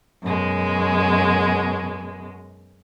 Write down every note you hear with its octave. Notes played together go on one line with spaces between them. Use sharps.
F#2 B2 G#3